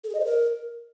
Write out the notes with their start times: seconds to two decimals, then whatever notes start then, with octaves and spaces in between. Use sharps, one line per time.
0.04 A4
0.09 G#4
0.15 D#5
0.20 C5
0.25 A#4